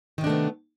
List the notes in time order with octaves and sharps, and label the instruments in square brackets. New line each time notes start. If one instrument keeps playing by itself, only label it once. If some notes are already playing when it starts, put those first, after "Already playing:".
[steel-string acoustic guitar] D#3
C3
D4
A3
B3